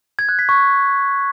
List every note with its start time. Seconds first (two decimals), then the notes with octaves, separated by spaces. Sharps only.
0.19 G#6
0.29 F#6
0.39 B6
0.49 C#6